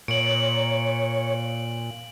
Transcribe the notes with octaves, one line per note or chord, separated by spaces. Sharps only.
A#2 C#5 D7 F#7